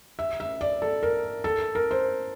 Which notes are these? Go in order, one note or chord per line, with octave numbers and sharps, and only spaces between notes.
E5
E5
D5
A4
A#4
A4
A#4
C5